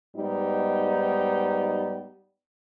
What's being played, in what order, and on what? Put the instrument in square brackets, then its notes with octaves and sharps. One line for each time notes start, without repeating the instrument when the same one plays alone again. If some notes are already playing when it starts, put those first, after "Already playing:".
[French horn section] G#2 G3 B3 D#4